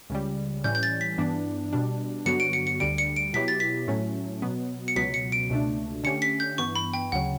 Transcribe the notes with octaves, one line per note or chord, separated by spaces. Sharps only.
C#2 C#3 G3
A2 E3 G3 C#4 G6
G6
A6
B6
G2 E3 B3 D4
B2 G3 D4
G2 D3 F#3 B3 F#4 C#7
D7
C#7
C#7
D2 D3 G3 D7
C#7
D7
B2 F#3 B3 E4 G4 B6
A6
B6
A2 F#3 A3 C#4
B2 F#3 B3
C#7
C#2 B2 F#3 B3 B6
C#7
D7
C#2 B2 A3 D4
D3 A3 C#4 G4 C#7
B6
G6
G2 E3 B3 C#6
B5
G5
D2 C#3 F#3 F#5